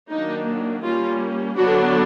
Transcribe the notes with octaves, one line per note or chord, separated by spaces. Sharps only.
D#3 F#3 A#3 D4 D#4
G3 A#3 C#4 F4
D3 F#3 B3 D4 F#4